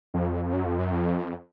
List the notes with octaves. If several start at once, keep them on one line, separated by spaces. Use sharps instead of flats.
F2
F#2
F2
F#2
F2